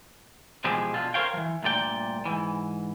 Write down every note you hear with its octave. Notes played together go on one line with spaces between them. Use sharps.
B2 E3 F3 G#3 G4 G#4
B2 D3 F4
A#4 C5 C#5 F5 G5
E3 F3
D2 G2 A#2 D5 G5
G#2 E3